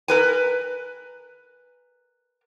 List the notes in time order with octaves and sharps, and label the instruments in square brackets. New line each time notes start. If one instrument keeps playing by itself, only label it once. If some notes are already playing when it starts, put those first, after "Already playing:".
[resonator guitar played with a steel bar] A#4 B4 G#5